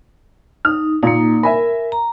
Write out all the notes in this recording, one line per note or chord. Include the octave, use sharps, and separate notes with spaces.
D#4 F6
A#2 A#3 D#4
A#4 E5 G#5 B5
A#5